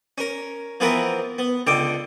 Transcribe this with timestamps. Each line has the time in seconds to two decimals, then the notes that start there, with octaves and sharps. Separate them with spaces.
0.18 C#4 A#4
0.80 E3 F3 B3 C4 A#4 B4
1.38 B3
1.67 C#2 D3 G5 D6